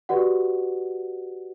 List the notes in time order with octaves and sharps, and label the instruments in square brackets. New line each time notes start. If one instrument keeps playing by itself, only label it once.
[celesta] F#4 G4 B4 D5 F#5